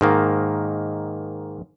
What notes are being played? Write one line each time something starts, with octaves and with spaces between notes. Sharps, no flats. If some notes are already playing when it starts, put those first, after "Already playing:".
G#2 D#3 A#3